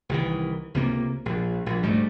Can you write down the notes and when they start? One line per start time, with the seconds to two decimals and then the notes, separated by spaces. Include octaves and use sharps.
0.09 C2 D#3 E3
0.74 C#2 C3 A#3
1.26 A#1
1.66 A#1
1.82 D2 G#2 G3 A3